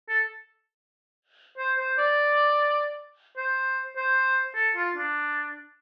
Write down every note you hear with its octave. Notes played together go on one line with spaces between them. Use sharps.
A4
C5
C5
D5
C5
C5
A4
F4
D4